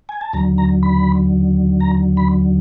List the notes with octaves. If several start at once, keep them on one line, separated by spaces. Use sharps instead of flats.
G#5
A5
D#2 D3 F#3 A#5
A#5
B5
A#5
B5